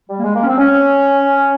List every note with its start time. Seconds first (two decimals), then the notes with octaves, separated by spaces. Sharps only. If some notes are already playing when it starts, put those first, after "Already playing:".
0.09 G3
0.18 A#3
0.24 G#3
0.36 A#3
0.42 C#4
0.47 C4
0.58 C#4